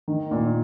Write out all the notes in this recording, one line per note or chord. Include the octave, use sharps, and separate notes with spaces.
D#3
A#2